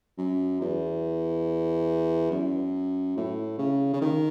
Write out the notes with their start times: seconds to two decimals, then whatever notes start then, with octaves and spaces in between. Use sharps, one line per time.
0.18 F#2
0.61 E2
2.31 F#2
3.17 A2
3.58 C#3
3.93 C#3
4.02 D#3